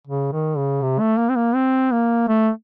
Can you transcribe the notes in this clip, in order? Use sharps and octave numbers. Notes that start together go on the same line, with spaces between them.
C#3
D#3
C#3
C3
A3
A#3
C4
A#3
C4
A#3
A3